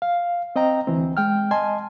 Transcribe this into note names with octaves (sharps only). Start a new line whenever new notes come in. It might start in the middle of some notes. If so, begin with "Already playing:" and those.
F5
C4 D#5 G5 A#5
D2 E3 C4
G#3 G5 F6
D#5 G#5 A5 C6